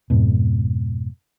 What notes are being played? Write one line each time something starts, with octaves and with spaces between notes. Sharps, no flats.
F2 G#2 B2